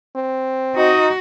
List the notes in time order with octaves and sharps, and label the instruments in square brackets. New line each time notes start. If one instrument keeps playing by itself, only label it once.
[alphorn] C4
[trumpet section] D#4 D#5 [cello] F#4